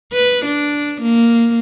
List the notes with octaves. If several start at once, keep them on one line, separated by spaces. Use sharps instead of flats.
B4
D4
A#3